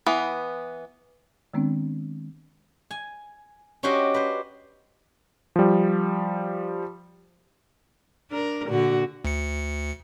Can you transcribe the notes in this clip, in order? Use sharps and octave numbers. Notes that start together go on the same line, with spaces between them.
E3 B3
D#3 G#3 B3 C4 D4
G#5
C#4 D4 F#4 G4 C5 D#5
B4 C5
F3 G3
D4 A#4
A#2 D3 F#4
D2 C#7